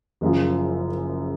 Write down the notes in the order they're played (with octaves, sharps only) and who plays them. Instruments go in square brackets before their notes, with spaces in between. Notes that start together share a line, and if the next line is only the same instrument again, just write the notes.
[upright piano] F#1 F#2 C#3 F3